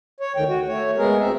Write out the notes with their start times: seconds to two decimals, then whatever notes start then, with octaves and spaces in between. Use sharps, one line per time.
0.20 C#5
0.36 D2 D3 D#3 G5
0.49 F#4
0.68 A3 C#5
0.97 G#3 B3 G#4 A#4
1.20 D2 C4 E5